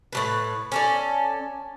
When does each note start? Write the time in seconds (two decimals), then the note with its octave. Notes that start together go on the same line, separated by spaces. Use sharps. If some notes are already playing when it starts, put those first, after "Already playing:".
0.13 A2 F#3 B4
0.72 C#4 A4 D5